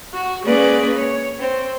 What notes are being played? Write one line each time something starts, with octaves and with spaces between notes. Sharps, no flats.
F#4
G#3 A#3 C#4 G#4 B4 D5
C#5
C4